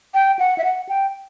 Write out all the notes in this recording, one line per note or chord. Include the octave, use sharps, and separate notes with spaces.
G5
F#5
E5
F#5
G5